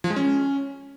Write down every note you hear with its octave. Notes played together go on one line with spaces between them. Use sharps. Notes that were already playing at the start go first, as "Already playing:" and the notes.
F3
G#3
C#4